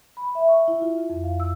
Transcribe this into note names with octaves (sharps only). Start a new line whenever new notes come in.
B5
E5
C#6
E4
F4
F2
F5
E6